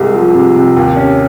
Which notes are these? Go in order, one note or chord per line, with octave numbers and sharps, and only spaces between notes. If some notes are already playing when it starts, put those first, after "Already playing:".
Already playing: C2 C3 G#3
F3
C3
C3
D#2
C#4